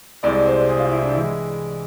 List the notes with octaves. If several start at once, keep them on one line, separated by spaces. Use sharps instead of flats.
C2 C3 G#3 D5
C5
G#4
F4
E4
D4
E3 G#3 E4